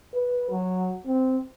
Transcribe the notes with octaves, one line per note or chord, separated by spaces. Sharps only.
B4
F#3
C4